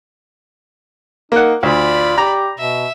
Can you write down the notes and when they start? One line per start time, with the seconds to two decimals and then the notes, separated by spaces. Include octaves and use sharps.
1.32 A#3 D#4 F#5
1.63 D2 F4 D5 B5
2.18 G4 A#5
2.59 B2 E5